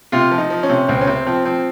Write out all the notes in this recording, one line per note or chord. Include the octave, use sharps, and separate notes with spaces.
C3 F4
F3
D#4
F3
C#4
C3
C#2 C4
C#4
C3 C4
F3 C4
F3 C4